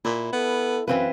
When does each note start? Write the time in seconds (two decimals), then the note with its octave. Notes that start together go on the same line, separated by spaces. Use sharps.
0.05 A#2 E4
0.33 B3 A4
0.88 F#2 E3 C4 B4 F5